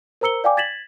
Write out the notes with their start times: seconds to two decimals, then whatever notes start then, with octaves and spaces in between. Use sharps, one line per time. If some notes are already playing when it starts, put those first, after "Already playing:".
0.21 A#4 C5 A#5 E6 C#7 G7
0.44 D5 F5 G5 G#5 D6
0.57 G#6 A6 B6 E7 F#7